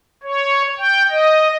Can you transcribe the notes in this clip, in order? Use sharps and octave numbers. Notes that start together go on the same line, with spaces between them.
C#5
G5
D#5